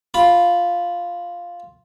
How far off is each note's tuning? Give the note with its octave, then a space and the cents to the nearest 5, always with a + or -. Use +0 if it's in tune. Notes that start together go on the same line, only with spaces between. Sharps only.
F4 +0 B5 +0